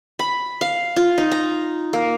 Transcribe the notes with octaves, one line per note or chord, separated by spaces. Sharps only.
B5
F5
F4
D#4
A#5
A#3